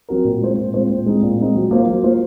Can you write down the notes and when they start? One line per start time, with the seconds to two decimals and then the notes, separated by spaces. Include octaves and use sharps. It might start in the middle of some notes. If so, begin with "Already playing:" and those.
0.09 F#3 C4 F#4 A#4
0.24 A#2
0.41 G#3 C4 F4 C5
0.58 A#2
0.74 G#3 C4 F4 C5
0.90 A#2
1.06 G#3 C4 D#4
1.22 A#2
1.39 G#3 C4 D#4
1.55 F#3
1.71 A#3 F4 C5
1.87 F#3
2.03 A#3 F4 C5